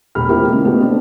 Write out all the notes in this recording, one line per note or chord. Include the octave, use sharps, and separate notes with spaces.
E1 G4 B5 F6
A#3 C4 E4 F4 G4 A#4
C#3 G#3
B2 A3 B3 G4
B3 C4 D4